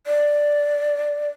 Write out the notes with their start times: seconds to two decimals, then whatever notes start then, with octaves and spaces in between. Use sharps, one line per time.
0.07 D5